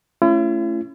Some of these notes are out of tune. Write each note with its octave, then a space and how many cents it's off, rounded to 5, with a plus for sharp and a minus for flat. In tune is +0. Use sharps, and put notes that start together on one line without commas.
A3 +0 C#4 +0 E4 +45